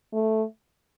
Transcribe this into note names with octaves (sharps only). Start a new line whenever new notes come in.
A3